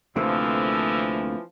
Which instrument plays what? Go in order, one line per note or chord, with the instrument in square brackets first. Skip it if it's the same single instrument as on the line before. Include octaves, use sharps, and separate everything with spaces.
[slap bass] D2 C3 [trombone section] E3 F3 [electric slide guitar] A3 A#3 C4 [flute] E6